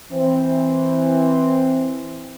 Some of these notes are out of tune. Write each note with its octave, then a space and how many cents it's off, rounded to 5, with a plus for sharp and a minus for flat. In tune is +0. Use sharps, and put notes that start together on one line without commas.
E3 -5 C4 +0